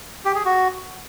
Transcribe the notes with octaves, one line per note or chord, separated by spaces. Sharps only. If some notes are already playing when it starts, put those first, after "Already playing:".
G4
G#4
F#4